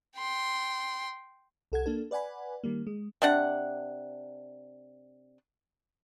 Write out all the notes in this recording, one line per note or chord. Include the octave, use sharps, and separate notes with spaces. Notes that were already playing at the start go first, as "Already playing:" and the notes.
G5 C6
C2 A4 F#5 G#6
A#3 D4 A4
B4 D5 F#5 G#5 B5
D#3 G3 A#3
G#3
C3 D4 F#5